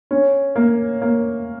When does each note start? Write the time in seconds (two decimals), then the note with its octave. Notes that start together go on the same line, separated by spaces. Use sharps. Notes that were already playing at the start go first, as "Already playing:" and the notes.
0.11 C#4
0.56 A#3
1.02 A#3